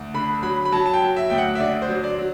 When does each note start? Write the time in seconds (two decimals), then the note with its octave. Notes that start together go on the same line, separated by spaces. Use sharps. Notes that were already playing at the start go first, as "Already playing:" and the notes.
Already playing: D2
0.14 D3 B5
0.43 F#3 B5
0.65 B5
0.72 F#3 A5
0.86 A5
0.94 G5
1.01 F#3
1.16 E5
1.30 D2 G5
1.38 F#5
1.55 E5
1.60 D3 D5
1.82 C5
1.88 F#3
2.04 D5
2.18 F#3